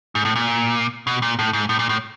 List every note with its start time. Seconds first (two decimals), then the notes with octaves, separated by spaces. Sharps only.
0.15 G#2
0.25 A2
0.36 A#2
1.07 B2
1.22 A#2
1.39 A2
1.53 G#2
1.69 A2
1.79 A#2
1.89 A2